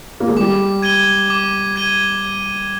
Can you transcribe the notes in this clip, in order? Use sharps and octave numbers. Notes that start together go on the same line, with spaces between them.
A#3
G#3
G3 D6
G#6 D#7 G7
D6
G#6 D#7 G7